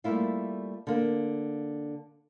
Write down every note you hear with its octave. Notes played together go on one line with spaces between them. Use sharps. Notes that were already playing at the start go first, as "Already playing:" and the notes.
G3 A3 A#3 E4 F4
D3 A#3